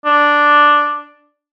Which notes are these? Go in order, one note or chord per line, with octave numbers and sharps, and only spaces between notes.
D4